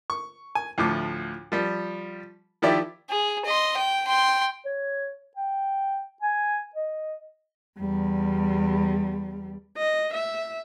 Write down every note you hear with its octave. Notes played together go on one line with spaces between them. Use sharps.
C#6
G#5
D2 A2 F3 D6
F3 G3
D#3 F3 E4 G4 D5 E5
G#4
D#5 C6
G5
G5 C6
C#5
G5
G#5
D#5
E2 G3
D#5
E5